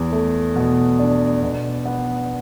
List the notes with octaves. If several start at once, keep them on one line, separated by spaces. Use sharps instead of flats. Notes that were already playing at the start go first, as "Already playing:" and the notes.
Already playing: E2
A3
B2
D4
B2
B3